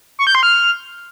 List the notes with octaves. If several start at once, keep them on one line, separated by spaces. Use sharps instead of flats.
C#6
G6
C6
F6